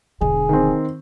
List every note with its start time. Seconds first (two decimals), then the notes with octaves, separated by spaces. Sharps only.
0.21 E1 D3 G#4
0.49 D#3 C4